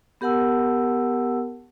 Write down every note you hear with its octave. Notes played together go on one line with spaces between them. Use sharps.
B3 G4 A#4 F#5 A5 E6